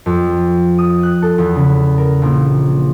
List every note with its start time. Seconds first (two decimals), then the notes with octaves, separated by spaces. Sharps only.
0.06 F2
0.78 D#6
1.03 F#6
1.22 A4
1.38 E2
1.56 C#3
1.98 A#4
2.22 A#1